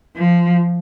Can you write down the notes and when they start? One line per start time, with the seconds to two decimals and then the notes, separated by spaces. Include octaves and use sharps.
0.16 F3